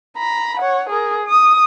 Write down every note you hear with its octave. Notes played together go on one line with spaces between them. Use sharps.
A#5 B5
C#5 F#5
G#4 A#4
D#6